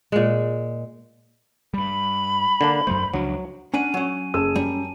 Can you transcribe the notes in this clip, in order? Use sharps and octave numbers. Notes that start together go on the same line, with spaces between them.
A#2 G#3
G2 G3 B5
D3 A#3 D4
F#2 F#3 A3 C5
C#2 F3 F#3 D4
C#4 D4 F#5 G#5 D#7
F#3 C#4
F#1 G#4 A5 E6 D#7
F#2 G3